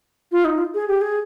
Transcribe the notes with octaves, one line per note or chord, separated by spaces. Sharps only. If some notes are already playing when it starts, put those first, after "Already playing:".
F4
D#4
F4
G#4
G4
G#4